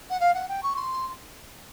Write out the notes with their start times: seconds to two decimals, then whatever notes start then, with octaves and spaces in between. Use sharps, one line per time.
0.10 F#5
0.20 F5
0.34 F#5
0.48 G5
0.63 C#6
0.76 C6